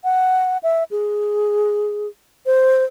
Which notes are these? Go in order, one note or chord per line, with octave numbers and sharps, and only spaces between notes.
F#5
E5
G#4
C5